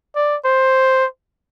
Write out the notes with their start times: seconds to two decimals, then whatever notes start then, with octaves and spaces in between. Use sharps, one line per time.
0.16 D5
0.45 C5